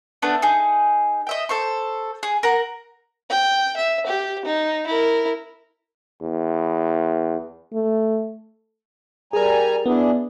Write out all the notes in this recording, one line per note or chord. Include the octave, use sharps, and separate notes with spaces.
A3 B3 D4
D#4 G#4
D#5 E5 G5
A4 C5 C#6
G#4
A#4 F#5 A#5
G5
E5
G4
D#4
E4 A#4
E2
A3
G3 G#4 A#4 G#5 A#5
B3 D4 E4 G#4